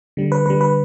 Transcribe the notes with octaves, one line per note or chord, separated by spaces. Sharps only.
D3 G3
B4
D3 G3 B4
B4